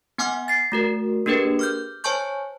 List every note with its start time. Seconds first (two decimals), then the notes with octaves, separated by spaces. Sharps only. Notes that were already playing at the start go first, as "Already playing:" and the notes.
0.18 B3 F#5 G#5 D6 F6
0.48 A6 C7
0.72 A3 F#4 A#4
1.26 A#3 D4 G4 G#4 A#4 B4
1.59 D6 F6 G6
2.04 C5 C#5 G#5 A5 C#6 G6